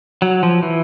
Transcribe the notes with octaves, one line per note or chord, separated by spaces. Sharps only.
F#3
F3
E3